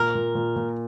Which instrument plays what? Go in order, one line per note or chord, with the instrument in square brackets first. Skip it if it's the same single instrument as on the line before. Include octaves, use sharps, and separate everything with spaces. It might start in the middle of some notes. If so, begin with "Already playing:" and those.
Already playing: [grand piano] A#2 [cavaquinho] A#4
[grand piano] A#2
A#2
A#2